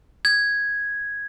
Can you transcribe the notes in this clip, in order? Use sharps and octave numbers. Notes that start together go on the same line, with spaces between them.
G#6